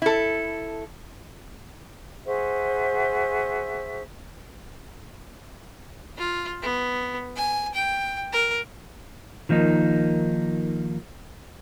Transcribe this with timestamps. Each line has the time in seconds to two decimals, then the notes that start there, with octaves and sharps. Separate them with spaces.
0.02 E4 A4
2.25 F#4 G#4 C5 E5
6.18 F4
6.62 B3
7.36 G#5
7.75 G5
8.32 A#4
9.49 D#3 F3 A#3 D#4